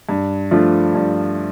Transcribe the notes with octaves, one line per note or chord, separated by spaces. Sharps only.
G2
F3 A3 D4 F4
G2